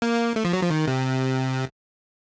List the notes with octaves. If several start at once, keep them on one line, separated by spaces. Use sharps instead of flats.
A#3
A3
F3
F#3
F3
D#3
C3